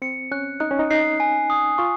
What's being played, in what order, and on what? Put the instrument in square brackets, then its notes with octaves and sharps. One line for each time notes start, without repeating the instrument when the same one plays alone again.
[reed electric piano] C4 [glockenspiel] C#7
[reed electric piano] C#4 [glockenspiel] F#6
[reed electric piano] D#4 [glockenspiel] F#6
[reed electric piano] C#4
D#4
[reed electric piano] D#4 [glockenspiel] C7
[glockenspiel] G#5
D#6
[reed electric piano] F4 [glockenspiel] C#6